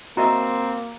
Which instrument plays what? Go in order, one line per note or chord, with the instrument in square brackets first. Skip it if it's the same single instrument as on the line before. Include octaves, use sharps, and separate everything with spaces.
[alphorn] A#3 [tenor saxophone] C4 [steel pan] F#4 D#5 E5 [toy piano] A#5